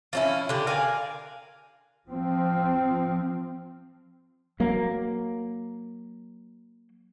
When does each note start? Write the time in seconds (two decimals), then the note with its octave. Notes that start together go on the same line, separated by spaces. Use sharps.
0.13 F3 C#4 E4
0.49 D3 G4
0.67 A#4 D5 F5 G#5
2.06 F3 C4
4.60 F#3 A#3